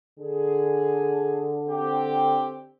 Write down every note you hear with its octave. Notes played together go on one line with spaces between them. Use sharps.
D3 G#4
C4 G4